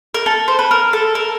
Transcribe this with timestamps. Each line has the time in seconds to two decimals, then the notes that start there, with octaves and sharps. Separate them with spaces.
0.14 A#4
0.26 A4
0.48 C5
0.59 B4
0.71 A#4
0.93 A4
1.15 A#4